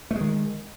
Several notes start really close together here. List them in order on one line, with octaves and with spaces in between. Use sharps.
A3 G#3 D#3